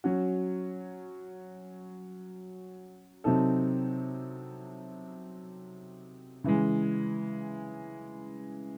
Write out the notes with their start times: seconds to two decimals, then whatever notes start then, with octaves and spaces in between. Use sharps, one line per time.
0.04 F#3 C#4 F#4
3.24 C3 F#3 C4 D#4 A4
6.44 C#3 E3 G#3